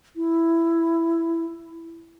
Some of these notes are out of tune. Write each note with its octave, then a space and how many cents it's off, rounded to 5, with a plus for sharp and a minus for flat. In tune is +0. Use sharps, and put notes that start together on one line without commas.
E4 +10